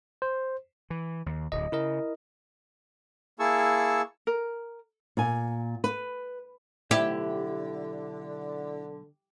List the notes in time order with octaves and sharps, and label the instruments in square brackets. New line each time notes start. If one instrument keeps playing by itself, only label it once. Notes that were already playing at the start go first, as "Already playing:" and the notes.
[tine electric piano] C5
[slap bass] E3
D#2
[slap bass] D1 D2 [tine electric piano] D#5
[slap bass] C#3 [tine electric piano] E4 A#4 D#5
[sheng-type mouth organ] A#3 E4 G#4 A5 C#6 E6
[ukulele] A#4
[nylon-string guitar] A#2 G#5
B4
[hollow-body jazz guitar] B1 C5 E5 [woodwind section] D3 [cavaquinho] E4 [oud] G4